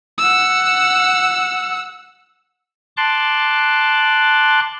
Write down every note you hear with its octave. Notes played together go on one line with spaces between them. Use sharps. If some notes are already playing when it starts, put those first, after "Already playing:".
F#5 E6
A5 C6 D6 F#6